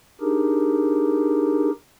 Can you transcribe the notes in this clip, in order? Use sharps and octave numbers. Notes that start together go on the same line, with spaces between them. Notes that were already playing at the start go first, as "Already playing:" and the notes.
D4 D#4 G4 G#4 A#4